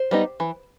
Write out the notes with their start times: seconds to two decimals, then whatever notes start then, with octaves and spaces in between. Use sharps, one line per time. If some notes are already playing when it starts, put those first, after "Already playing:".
Already playing: C5
0.11 G3 B3 D#4
0.40 E3